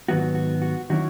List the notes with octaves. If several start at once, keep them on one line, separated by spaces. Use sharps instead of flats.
G#2 D#3 F#3 B3 F#4
F#4
F#4
D#3 F#3 C#4 E4 F#4